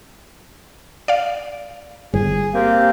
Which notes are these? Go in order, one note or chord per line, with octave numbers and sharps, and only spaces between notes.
D5 F5
G1 G#4
A#3 C4 G4